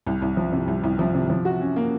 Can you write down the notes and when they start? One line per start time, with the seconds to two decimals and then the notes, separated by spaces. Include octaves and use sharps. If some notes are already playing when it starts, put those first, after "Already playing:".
0.06 C2
0.22 C2
0.37 F3
0.53 C3
0.68 C2
0.83 C2
0.99 F3
1.15 C3
1.30 F3
1.45 F#4
1.61 C#4
1.76 A#3